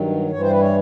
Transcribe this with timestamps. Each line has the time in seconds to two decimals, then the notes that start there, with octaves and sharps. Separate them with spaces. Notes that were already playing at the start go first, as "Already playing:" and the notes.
Already playing: G2 D#3 F#3
0.31 G2 E3 G3 C#5
0.41 C5
0.50 B4
0.61 C#5